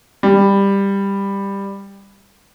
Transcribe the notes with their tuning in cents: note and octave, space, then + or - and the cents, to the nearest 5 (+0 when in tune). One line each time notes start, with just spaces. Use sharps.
G3 +15